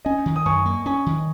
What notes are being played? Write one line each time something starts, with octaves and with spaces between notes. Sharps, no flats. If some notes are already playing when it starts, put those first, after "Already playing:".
C#4 D#5 G#5
D#3
D#6
F#2 G#5 C#6
A#3
C#4 G#5 C#6
D#3